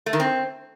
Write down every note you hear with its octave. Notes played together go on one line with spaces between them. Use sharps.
A3
D#3
C4